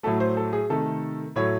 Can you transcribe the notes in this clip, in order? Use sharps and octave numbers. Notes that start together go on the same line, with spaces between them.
A2 F#3 A3 A4
C5
A4
G#4
C3 D#3 A3 A4
A2 F#3 A3 C#5